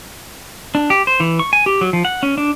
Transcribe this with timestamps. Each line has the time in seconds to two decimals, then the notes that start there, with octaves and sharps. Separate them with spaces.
0.75 D4
0.90 G4
1.07 C5
1.20 E3
1.39 C#6
1.53 G#5
1.66 G4
1.81 F#3
1.93 F3
2.05 F#5
2.23 C#4
2.38 D4